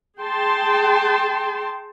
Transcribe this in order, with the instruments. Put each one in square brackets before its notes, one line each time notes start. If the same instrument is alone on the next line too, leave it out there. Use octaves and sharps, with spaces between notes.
[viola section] G#4 G5 A5 C6